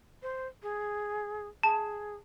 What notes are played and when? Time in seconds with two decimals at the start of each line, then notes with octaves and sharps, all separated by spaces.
0.23 C5
0.63 G#4
1.63 G#4 A5